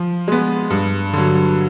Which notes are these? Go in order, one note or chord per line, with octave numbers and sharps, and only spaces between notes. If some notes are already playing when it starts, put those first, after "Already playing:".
Already playing: F3
G#3 B3
G2
D3 F#3